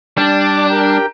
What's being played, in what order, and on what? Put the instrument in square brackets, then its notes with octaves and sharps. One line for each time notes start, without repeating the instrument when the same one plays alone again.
[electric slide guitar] G3 [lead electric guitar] D4 [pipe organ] D5 A5 D6
[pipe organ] G4 A#4 G5